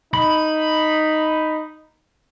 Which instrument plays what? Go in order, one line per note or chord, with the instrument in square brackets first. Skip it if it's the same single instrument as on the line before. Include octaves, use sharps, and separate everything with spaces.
[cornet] D#4 [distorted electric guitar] B5